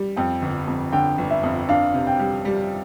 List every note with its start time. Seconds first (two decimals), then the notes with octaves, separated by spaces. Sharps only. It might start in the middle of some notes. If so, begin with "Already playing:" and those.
Already playing: G3
0.17 F2 G5
0.42 G1
0.67 F2
0.92 D3 G5
1.18 G1
1.30 E5
1.43 F2
1.69 D4 F5
1.94 C3
2.07 G5
2.19 G3
2.45 G3